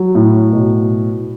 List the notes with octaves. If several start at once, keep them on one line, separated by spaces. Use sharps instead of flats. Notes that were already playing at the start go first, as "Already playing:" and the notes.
Already playing: F#3
A2
B2